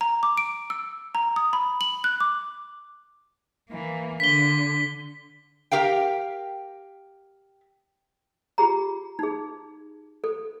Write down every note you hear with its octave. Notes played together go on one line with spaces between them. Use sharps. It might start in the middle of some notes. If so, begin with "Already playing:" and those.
A#5
D6
D7
E6
A#5
D#6
B5
F#7
F#6
D6
E3 A#3
D3 B6 G7
G4 A#4 F5 G5
F4 G4 G#4 A#5
D#4 G#4
A4